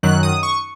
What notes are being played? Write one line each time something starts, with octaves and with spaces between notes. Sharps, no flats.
F#2 D#3 F#3 F#6
D#6
C#6